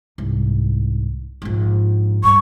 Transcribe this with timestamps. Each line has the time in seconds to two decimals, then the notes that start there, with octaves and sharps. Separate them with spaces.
0.18 C2 G#2
1.42 A#1 G#2
2.24 G2 C#6